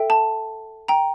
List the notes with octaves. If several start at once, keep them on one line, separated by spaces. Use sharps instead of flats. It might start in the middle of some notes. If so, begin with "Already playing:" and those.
Already playing: A4 E5 G5
A5
G5 A#5